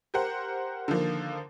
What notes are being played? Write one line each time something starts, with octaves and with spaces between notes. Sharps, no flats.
G4 A#4 C5 F#5
D3 D#3 F3 A#3